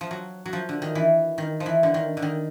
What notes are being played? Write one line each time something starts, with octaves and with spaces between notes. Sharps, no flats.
F3
F#3
F#3
F3
D3
D#3
E3
D#3
F3
E3
D3
D#3
D3
D#3